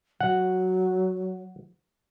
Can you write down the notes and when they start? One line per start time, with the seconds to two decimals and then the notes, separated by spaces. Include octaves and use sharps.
0.21 F#3 F#5